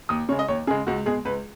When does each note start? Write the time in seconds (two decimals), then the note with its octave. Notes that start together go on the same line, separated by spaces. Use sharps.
0.09 D#2 D#6
0.29 C#3 C#5
0.32 G#3
0.39 D#5
0.48 D#2 C#5
0.67 C#3 G#4
0.70 G#3
0.87 C#2 F#4
1.06 B2 G#3 G#4
1.25 C#2 B4